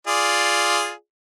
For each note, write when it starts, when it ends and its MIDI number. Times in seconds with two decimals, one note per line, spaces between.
0.07 0.92 65
0.07 0.92 68
0.07 0.92 74